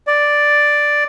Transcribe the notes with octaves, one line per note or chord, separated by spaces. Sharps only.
D5